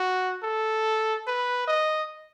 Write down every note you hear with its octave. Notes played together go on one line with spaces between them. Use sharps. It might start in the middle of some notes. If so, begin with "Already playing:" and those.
Already playing: F#4
A4
B4
D#5